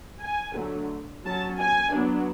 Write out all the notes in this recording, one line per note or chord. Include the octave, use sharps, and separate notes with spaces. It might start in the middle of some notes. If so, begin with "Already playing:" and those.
G#5
D3 F#3 A3
F#3 C#4 A5
G#5
F#3 B3 D4